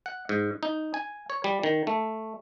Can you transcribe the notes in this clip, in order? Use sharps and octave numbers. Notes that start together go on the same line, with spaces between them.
F#5
G#2
D#4
G#5
C#5
G3
D#3
A3